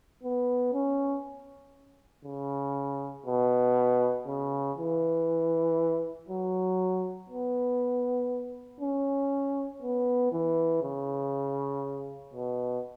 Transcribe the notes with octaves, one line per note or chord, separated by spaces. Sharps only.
B3
C#4
C#3
B2
C#3
E3
F#3
B3
C#4
B3
E3
C#3
B2